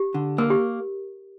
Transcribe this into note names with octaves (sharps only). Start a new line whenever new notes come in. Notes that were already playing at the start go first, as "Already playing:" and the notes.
Already playing: G4
D3
A#3 A#4
G4